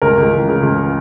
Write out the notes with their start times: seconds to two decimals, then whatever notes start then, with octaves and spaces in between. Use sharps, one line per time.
0.02 C#2 A#4
0.17 C#2
0.33 E3
0.48 C#3
0.63 C#2